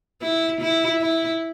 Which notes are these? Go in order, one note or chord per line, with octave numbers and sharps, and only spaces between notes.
E4
E4
E4